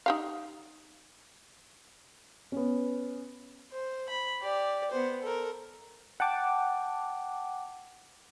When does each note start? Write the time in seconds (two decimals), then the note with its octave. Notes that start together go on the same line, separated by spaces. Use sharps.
0.06 D#4 G4 F5
2.52 B3 C#4
3.72 C5
4.09 B5
4.41 G4 D5
4.91 B3 C5
5.22 A4 A#4
6.20 F#5 G5 A5 D6